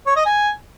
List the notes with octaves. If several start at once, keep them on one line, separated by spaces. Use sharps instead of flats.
C#5
D#5
G#5